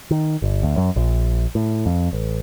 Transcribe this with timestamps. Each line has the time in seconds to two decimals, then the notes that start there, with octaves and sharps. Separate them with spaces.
0.11 D#3
0.42 G1
0.63 D2
0.77 F#2
0.96 A#1
1.55 A2
1.86 F2
2.13 A1